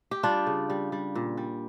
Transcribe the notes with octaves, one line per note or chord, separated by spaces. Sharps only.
G4
G3 D4 F4
C#3
G3
G3
A#2
G3